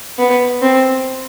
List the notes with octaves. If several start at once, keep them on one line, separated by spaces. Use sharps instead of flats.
B3
C4